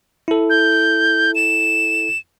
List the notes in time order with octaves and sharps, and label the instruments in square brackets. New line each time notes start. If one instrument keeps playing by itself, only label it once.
[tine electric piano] E4 A4
[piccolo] G6
E7